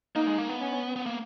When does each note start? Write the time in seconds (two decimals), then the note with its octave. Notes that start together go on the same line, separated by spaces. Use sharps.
0.16 A#3 D#4
0.27 G#3
0.38 A#3
0.49 B3
0.61 C#4
0.96 B3
1.06 A#3